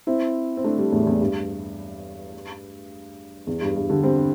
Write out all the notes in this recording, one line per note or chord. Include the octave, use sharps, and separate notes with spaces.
C4 E4
C4
A3 D4
G3 C4
E2 A2
E2
G2
E2
G2
G2
D3 G3
G3 C4